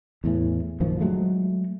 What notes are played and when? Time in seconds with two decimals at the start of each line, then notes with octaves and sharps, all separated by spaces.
0.24 E2 A2 E3
0.80 A#1 F#2 D#3 F3
1.01 F#3 G#3 A3